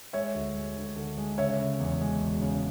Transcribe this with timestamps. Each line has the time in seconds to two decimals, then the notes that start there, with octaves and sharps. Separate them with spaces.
0.13 G#3 C#5 E5
0.34 D2
0.55 G#3
0.76 D2
0.96 D3
1.18 G#3
1.38 C#3 C#5 E5
1.59 C#3
1.80 E2
2.01 G#3
2.22 E1
2.42 C#3